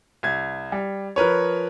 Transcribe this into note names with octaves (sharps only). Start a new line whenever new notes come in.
C2 G#6
G3
F3 A#4 B4 C#5